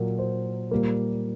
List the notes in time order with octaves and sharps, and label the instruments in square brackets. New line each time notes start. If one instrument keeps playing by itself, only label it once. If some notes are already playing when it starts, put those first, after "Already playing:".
Already playing: [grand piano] A#2 F#3 A#3 A#4
C5
A#2 G3 A#3